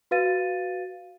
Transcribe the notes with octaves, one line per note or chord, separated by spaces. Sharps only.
F#4 B4 F5 A6 D#7